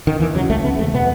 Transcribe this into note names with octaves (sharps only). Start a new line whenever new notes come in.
D#3
D#2 E3
C#3 F#3
C#2 A3
C#3 B3
E2 A3
B2 B3